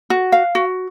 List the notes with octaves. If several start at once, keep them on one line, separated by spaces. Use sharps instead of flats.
F#4
F5
F#4